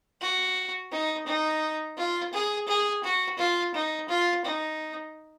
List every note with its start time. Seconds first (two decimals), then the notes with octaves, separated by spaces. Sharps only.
0.21 F#4
0.92 D#4
1.26 D#4
1.97 F4
2.33 G#4
2.68 G#4
3.03 F#4
3.38 F4
3.74 D#4
4.09 F4
4.45 D#4